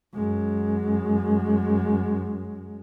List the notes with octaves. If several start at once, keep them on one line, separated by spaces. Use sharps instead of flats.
F#2 G#3